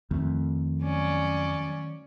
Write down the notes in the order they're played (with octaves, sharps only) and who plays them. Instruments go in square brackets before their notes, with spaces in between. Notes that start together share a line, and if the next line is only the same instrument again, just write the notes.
[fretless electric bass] F2 [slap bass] D#3 A3
[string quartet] F#3 C#4 D5